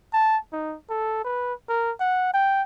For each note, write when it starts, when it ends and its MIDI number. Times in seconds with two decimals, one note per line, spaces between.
0.13 0.37 81
0.53 0.75 63
0.90 1.21 69
1.25 1.54 71
1.69 1.91 70
2.00 2.29 78
2.34 2.62 79